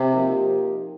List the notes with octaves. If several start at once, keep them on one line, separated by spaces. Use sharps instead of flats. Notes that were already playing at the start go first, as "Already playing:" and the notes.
Already playing: C3
F3 A#3 D#4 G4